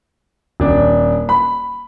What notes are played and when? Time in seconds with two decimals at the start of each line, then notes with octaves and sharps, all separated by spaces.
0.60 D#1 D4
1.29 B5